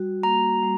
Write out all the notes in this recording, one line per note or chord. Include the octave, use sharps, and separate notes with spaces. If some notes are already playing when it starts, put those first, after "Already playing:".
Already playing: G3 F#4
A#3 A#5
G3